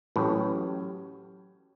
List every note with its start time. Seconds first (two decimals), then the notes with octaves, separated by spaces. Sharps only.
0.16 A1 A2 F#3 C#4 G4